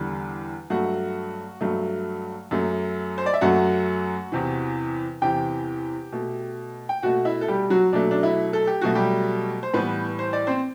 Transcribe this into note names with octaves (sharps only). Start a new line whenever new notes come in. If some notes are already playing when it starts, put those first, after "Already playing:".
Already playing: E2 D3 G3
G2 F#3 A3 F#4 F#5
G2 F#3 A3
F#2 F#3 A3
C5
D5
E5
F#2 F#3 A3 F#4 F#5
E2 C3 E3
E2 C3 E3 G4 G5
B2 A3
G5
B2 A3 F#4 F#5
E4 E5
A4
G3 G4
F#3 F#4
B2 F#3 A3 D4
D4
E4
A4
G4
B2 F#3 A3 F#4
G3 G4
C5
A2 E3 G3 B3 B4
C5
D5
C4 C5